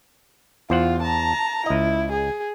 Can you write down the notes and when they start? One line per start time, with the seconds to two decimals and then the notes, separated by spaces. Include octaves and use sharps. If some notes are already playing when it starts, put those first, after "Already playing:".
0.70 E2 F4 C5 F#5
1.03 A5 A#5
1.66 C#2 E4 D#5
2.12 G#4